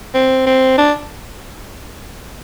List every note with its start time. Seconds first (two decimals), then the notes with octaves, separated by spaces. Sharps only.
0.14 C4
0.46 C4
0.78 D4